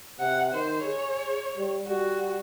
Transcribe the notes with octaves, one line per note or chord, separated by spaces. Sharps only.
C3 F#5
D#3 C5
G#4 C#5
G3
G3 F#4